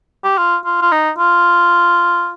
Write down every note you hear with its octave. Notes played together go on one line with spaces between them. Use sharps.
G4
F4
F4
F4
D#4
F4